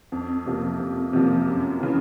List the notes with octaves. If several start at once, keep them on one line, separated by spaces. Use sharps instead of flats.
F2
C3 F3 A#3
F2
C3 F3 A#3
F#2
C#3 E3